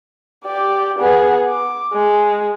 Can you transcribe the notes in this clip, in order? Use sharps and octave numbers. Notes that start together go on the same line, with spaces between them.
G4 D5
B3 G#4
D6
G#3